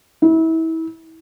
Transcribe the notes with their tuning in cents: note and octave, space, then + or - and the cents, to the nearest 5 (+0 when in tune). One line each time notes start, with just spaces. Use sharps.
E4 -30